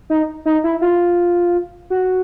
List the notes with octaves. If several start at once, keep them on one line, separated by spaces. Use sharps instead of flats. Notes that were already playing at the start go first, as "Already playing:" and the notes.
D#4
D#4
E4
F4
F#4